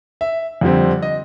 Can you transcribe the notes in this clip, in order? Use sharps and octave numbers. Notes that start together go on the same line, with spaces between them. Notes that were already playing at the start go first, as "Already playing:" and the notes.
E5
F2 D3 G3 C4
D#5